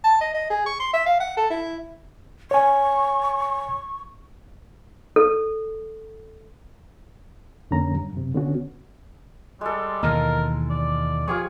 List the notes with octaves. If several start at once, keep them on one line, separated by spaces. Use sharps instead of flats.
A5
D#5
D#5
G#4
C#6
C6
E5
F5
F#5
A4
E4
C#5 G#5 C#6
A4
F2 D3 A#3 C#4 A#5
G2
F#2 C3
D3 B3 C#4 F#4
G3 G#3 A4
D#2 B2 E3 A#4 D#5 F5
D5
F3 F4 G4 G#4 C#5